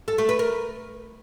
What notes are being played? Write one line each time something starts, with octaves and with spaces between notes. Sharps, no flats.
A4
A3
B4
A#4